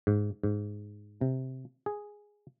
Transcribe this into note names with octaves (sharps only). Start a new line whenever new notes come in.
G#2
G#2
C3
G#4